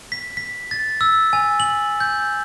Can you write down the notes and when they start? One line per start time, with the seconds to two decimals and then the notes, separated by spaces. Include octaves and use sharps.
0.12 B6
0.37 B6
0.71 A6
1.01 E6
1.33 G#5
1.60 F#7
2.00 G6